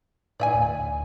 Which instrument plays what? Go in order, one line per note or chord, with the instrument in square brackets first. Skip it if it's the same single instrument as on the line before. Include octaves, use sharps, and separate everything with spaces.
[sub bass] A2 [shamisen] D5 E5 G#5
[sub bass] D2